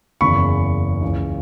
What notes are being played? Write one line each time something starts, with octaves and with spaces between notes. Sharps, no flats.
F#1 E2 C#3 E3 B5 C#6
C#2 C#3 E3